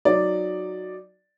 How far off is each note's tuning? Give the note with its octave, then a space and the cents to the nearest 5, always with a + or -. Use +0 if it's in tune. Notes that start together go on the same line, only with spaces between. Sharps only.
F#3 +0 D#4 +0 D5 +0